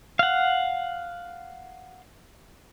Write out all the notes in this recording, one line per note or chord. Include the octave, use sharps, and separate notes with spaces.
F5 F#5